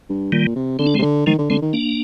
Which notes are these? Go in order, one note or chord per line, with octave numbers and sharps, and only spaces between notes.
G2
A#2 D#3 G3
C3
D3 C4
D4
C3 G#3 C4
D3
D#3 F3 G#3
D3
D3 G#3 C4
D#3
A#3 D4